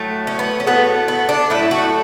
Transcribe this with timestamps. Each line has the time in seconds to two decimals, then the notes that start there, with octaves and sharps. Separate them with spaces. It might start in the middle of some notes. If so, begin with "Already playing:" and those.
Already playing: A2 F#3 A3
0.27 C#4
0.39 B3
0.60 C#4
0.66 A2 F#3 A3 B3
1.08 B3
1.29 D4
1.50 A2 F#3 A3 E4
1.71 F#4